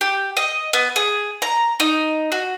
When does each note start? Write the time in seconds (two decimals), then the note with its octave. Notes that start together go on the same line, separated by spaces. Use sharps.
0.01 G4
0.37 D#5
0.73 B3
0.96 G#4
1.42 A#5
1.80 D#4
2.32 F#4